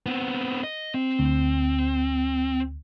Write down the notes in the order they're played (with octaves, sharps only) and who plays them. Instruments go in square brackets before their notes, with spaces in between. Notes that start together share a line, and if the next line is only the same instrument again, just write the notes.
[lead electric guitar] B3 C4
D#5
C4
[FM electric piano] D2